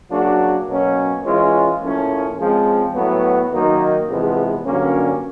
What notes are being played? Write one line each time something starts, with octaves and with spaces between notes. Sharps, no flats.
C#3 F#3 A#3 D4 F#4
B2 F#3 A#3 C#4
E3 G#3 C#4 F4
A2 F3 A#3 C#4
C#3 F3 G#3 C4
A2 F#3 B3
F#2 D#3 F#3 A#3 D#4
E2 C3 F3 G#3 B3
G2 D3 F#3 A#3 C#4